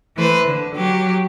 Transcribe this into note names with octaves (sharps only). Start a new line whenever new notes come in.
E3 A3 B4 C5
D3
F#3 G4